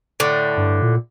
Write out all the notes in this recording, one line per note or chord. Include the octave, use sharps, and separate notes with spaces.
A2 D3
G2
A#2